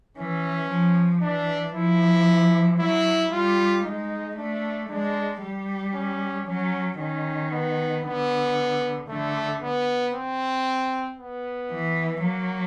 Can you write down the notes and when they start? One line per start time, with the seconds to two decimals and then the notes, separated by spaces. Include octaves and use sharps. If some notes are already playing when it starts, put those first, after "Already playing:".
0.17 E3 C#4
0.69 F3
1.22 E3 D4
1.74 F3 E4
2.79 F#3 E4
3.31 G3 F4
3.85 G#3 D#4
4.36 A3 D4
4.89 G#3 D4
5.42 G3
5.94 C#4
6.46 F#3 C#4
6.99 D#3 C#4
7.51 B3
8.04 D3 B3
9.09 D3 A3
9.61 B3
10.14 C4
11.19 B3
11.71 E3
12.23 F#3 A#3